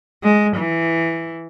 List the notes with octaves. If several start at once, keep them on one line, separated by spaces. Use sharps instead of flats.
G#3
E3